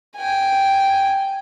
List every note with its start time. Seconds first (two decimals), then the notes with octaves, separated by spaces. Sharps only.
0.18 G5 G#5